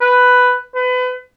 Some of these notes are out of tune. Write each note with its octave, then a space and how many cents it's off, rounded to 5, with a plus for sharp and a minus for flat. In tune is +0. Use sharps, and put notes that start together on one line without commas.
B4 +5
B4 +30